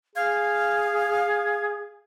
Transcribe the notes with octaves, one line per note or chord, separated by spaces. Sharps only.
G#4 F5 G#6